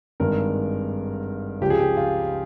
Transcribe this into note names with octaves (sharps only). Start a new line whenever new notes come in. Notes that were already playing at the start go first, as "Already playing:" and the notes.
G#1 G2 D#3 G#3 A#4
C#2 C#3 F3 G4
G#4
G4
F4